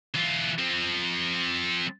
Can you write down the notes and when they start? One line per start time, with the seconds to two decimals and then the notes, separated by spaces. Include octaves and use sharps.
0.14 E3 F4
0.58 F3 C4